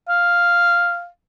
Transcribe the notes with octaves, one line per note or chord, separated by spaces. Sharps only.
F5